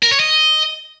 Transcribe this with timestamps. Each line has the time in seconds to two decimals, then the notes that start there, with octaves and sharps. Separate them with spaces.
0.03 A#4
0.11 C#5
0.20 D#5